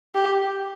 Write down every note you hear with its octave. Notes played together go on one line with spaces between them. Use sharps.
G4